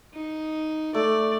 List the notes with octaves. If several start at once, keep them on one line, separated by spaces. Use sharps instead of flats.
D#4
A3 D5